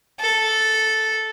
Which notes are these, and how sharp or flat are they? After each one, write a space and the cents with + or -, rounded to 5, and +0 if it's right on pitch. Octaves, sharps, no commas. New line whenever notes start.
A4 -5